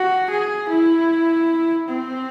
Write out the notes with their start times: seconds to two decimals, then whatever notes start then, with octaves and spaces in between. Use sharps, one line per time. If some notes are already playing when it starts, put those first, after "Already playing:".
Already playing: F#4
0.31 G#4
0.70 E4
1.89 C4